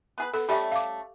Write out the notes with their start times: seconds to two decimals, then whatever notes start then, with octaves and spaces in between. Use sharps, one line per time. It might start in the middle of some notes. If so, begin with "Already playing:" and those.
0.18 B3 G#4 B4
0.34 B3 A4
0.49 G3 A3 C#4 G4 E5
0.72 F5 D6